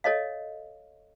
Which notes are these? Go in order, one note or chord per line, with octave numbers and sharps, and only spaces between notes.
A4 C#5 D#5 F5